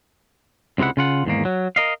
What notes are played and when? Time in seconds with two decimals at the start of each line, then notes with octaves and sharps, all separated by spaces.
0.78 C#2 C3 G#3 E4 F#5
0.97 C#3 F4 F#5
1.25 E2 G#2 D#3 A#3
1.45 F#3
1.76 A#4 D#5 F5